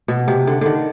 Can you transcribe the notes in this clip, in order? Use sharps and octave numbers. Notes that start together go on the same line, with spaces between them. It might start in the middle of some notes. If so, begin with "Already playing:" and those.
B2
C3
D3
D3 D#3